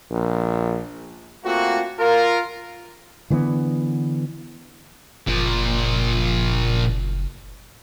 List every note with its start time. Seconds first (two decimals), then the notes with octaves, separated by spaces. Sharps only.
0.11 A#1
1.44 A3 A#3 C4 F4 F#4
1.99 F4 A#4
3.30 D3 E3 G#3 B3
5.27 F#1 A#2 F3